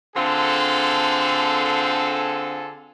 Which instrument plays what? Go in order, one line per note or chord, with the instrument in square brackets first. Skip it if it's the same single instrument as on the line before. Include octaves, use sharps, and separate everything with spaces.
[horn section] D3 C4 F4 G#4 A4